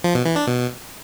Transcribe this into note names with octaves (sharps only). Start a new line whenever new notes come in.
F3
B2
E3
D4
B2